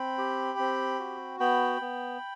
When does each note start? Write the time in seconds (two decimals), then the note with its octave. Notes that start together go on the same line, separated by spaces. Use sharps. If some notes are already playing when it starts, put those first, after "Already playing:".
Already playing: C4 G5 B5
0.18 G4
0.59 C4
0.99 F#4
1.40 B3 G5 B5
1.81 B3